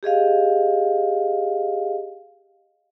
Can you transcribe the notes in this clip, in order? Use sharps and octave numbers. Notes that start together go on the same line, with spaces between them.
G4 G#4 D#5 F5